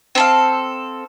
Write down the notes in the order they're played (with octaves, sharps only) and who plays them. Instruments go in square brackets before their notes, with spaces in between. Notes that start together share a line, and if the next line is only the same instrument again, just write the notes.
[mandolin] C4 A4 F5